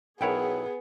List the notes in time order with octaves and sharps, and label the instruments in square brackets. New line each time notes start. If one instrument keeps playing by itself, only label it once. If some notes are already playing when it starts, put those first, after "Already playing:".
[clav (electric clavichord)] B1 E4 C#5 [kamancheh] B3 [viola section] G#4 [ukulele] A#4 F#5 G5